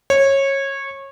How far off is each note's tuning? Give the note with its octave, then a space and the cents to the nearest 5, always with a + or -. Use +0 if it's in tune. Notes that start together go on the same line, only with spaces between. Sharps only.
C#5 -20